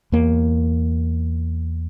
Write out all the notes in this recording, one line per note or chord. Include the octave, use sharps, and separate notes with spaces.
E2 A#3